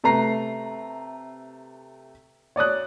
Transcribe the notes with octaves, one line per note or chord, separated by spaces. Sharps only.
C3 A3 B4 A#5 C7
C#5 D5 D#6 F#6